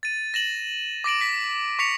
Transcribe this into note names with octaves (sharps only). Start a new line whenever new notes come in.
A6 D#7
A#6 E7 F#7
D6 A#6 D7 F#7
B6
C#6 B6 C#7 F7